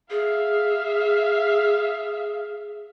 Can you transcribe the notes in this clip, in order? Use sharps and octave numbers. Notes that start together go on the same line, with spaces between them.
G#4 E5 F5